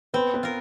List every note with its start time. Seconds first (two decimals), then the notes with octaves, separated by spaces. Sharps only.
0.14 B3 C4 B4
0.34 B3 B4
0.43 F4 A#4